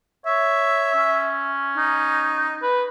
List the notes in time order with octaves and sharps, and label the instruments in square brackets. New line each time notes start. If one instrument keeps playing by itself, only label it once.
[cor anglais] C#5 [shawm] E5
[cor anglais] C#4
[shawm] D#4
[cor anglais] B4